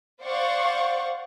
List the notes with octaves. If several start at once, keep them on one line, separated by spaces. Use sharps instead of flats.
C5 D5 F5 F#5 C#6